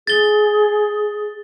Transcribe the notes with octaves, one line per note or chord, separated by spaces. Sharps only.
G#4 A6 G7